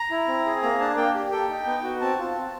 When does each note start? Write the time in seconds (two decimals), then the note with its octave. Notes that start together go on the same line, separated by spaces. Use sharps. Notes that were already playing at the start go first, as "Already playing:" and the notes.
Already playing: A#5
0.11 E4
0.28 C4
0.46 G#4
0.62 A#3 A#5
0.80 D4 A5
0.97 A#3 G5
1.15 G4
1.32 A4 G5
1.50 D#4
1.66 B3
1.83 F#4
2.01 C4 A5
2.19 F4
2.35 C4